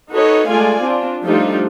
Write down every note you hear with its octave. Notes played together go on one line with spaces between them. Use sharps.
D#4 F#4 A4 B4 C#5 D#5
G#3 A3 F4 D5 F5 G#5
C4 D4 F4
F3 G3 A3 D4 D#4 F4